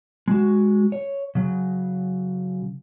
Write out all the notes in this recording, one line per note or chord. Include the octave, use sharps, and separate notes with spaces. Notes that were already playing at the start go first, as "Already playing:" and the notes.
G#3 F#4
C#5
C#3 F#3